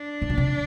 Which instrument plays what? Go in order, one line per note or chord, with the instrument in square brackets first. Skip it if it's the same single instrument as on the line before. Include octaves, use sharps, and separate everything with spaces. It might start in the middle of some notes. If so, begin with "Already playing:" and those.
Already playing: [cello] D4
[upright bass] A2
A#2
C3